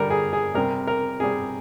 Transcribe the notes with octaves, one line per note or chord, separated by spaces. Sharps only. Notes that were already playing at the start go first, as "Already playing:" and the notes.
Already playing: D3 G3 A#4
G#4
G#4
C3 G3 A#4
A#4
C3 G3 G#4